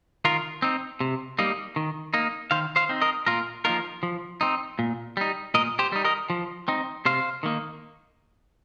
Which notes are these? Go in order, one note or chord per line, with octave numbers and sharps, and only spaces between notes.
D#3 F4 A#4
C4 D#4
C3
G3 A#3 D#4
D#3
A#3 D#4
D#3 C5 F5
C5 F5
C4 D#4
A#4 D#5
A#2 F4 A#4
F3 A#3 D#4 F4 A#4
F3
C4 D#4
A#2
G3 D#4
A#2 A#4 D#5
G4 C5
G3 D#4
A#4 D#5
F3
C4 D#4
C3 C5 F5
D#3 A#3 D#4